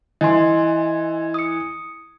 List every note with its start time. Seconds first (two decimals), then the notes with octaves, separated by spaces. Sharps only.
0.21 E3 D#5 G#5 C6
1.34 D#6 C#7